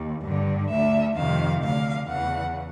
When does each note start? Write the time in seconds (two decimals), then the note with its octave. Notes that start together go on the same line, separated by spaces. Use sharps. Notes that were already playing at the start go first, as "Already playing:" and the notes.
Already playing: D#2
0.25 G2 D3
0.71 D2 D3 E5
1.17 F2 C3 D#3 F5
1.63 D2 D3 F5
2.09 E2 C#3 E3 F#5